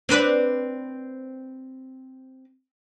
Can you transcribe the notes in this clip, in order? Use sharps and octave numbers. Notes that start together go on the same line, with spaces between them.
C4 D4 B4